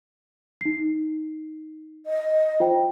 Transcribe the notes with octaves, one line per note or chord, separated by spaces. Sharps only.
D#4 C7
D#5
F4 C5 G5